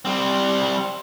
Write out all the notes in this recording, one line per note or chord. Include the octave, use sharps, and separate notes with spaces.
G3 C4